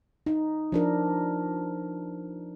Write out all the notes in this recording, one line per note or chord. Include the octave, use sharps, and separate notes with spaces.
D#4
F3 D4 A#4